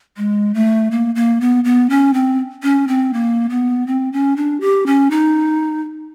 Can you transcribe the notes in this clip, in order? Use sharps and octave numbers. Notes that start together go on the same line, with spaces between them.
G#3
A3
A#3
A#3
B3
B3
C#4
C4
C#4
C4
A#3
B3
C4
C#4
D4
G4
C#4
D#4